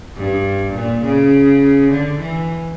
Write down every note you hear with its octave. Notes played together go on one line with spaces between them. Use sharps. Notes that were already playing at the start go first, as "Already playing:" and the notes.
G2
A#2
C#3
D3
E3